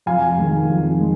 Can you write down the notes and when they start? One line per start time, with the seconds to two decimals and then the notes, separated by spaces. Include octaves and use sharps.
0.06 F2 F5 G#5
0.38 D#3 G#3
0.69 F2
1.01 G#3